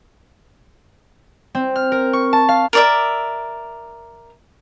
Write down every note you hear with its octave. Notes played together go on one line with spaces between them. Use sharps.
C4
F6
A#4
C#6
A5
F5
A#4 D5 E5